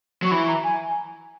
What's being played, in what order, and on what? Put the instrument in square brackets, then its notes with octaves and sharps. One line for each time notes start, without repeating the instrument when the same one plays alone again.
[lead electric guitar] F#3 [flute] C#6
[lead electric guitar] E3 [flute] B5
[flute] A#5
G#5